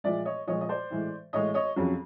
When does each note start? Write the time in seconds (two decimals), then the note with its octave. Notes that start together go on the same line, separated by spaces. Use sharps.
0.04 A#2 F3 G#3 D5 E5
0.25 C#5 D#5
0.47 A#2 F3 G#3 C#5 D#5
0.61 D#5
0.69 C5 D5
0.90 A2 E3 G#3
1.33 A2 E3 G#3 C#5 D#5
1.54 C#5 D#5
1.76 F2 C#3 F#3